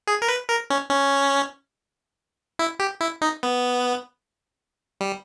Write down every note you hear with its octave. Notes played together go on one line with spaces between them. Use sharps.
G#4
A#4
B4
A#4
C#4
C#4
E4
G4
E4
D#4
B3
G3